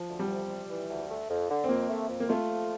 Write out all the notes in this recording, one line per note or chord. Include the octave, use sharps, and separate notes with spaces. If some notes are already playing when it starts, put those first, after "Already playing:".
Already playing: F3
D2
G3
C3
G3
E3
D2
A3
F2
D3
C4
F2 A#3
A3
F2
A#3
A3 F4
F3